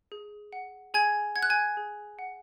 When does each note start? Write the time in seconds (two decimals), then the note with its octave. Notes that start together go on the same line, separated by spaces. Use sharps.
0.12 G#4
0.53 F#5
0.94 G#4 G#5 G#6
1.36 F#5 G#6
1.43 F#6
1.50 G#5 G#6
1.77 G#4
2.19 F#5